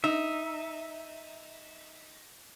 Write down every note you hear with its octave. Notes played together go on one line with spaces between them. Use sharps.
D#4 E5